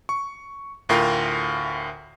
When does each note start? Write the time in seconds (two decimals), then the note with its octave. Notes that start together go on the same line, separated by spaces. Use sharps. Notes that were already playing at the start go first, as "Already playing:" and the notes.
0.09 C#6
0.89 D2 A2 F4 A#4 F5 G5